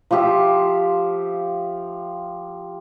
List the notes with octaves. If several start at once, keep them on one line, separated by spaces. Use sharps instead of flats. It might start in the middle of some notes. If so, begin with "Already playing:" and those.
F3 F4 G4 E5